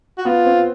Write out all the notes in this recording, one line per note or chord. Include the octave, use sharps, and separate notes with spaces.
F#4
B3 F4
C4